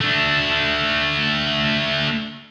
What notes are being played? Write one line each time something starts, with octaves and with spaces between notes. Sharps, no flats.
A3 D4